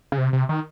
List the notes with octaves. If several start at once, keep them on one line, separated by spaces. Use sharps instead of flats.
C#3
C3
C3
D#3